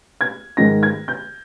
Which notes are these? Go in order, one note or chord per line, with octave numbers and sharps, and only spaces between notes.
G#6
G#2 D#3 A#6
G#6
G6